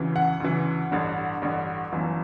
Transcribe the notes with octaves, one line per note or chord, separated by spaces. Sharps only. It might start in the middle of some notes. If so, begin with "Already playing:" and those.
Already playing: D2 C#3 E3
F#5
D2 C#3 E3
A1 G2 D3
A1 G2 D3
G1 F#2 E3